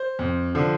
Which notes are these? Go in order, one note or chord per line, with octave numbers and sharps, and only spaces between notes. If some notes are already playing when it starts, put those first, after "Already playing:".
Already playing: C5
F2
D3 F3